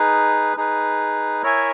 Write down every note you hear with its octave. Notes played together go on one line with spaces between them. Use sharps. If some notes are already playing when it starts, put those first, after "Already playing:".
Already playing: D#4 G#4 B4
D#4 G#4 B4
E4 A#4 C#5 E5 G#5